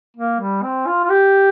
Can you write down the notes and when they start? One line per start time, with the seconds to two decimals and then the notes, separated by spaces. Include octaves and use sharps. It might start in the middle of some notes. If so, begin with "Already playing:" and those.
0.17 A#3
0.40 G3
0.63 C4
0.87 F4
1.05 F4
1.10 G4